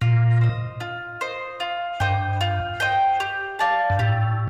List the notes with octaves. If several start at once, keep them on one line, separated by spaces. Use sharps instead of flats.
A#2 F4
C5 D#5
F4
C5 D#5
F4
G2 C5 D#5 G5
F4
C5 D#5 G5
G4
D5 F5 A5
G2
A2 G4